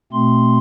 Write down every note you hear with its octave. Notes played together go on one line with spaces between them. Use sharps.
B2 A3 C4 C6